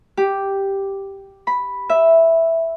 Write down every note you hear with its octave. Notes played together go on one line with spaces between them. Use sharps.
G4
B5
E5